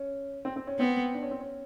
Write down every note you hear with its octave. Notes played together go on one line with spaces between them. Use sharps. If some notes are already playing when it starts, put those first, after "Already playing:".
Already playing: C#4
C4
C4
C#4
B3 C4
D4
C#4
C4
C#4